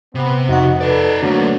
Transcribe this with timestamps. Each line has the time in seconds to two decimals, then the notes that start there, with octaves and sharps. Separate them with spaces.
0.15 C3 B3 C4
0.49 F2 D#4 F#4 F#5
0.81 D#4 A4 B4 D5
1.22 D3 F#3 A3 A#3 D4